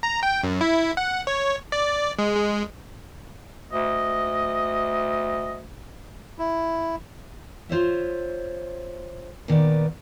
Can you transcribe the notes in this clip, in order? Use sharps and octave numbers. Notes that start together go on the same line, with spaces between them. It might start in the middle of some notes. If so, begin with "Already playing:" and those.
A#5
G5
F#2
E4
F#5
C#5
D5
G#3
G#3
D2 D#5
E4
F4 C5 C#5 E5
A#2 D#3 B3 D5